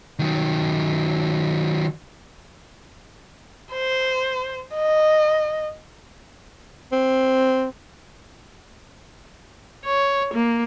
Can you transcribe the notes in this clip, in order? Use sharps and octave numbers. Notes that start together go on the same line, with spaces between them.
D#3 F#3
C5
D#5
C4
C#5
A#3